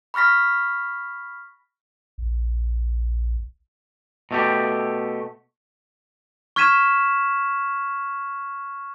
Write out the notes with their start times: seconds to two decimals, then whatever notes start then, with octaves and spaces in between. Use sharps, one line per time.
0.14 B5 C#6 F6 A#6 B6
2.18 A#1
4.31 B2 A3 G4
6.56 C#6 F6 G#6 B6 D#7 E7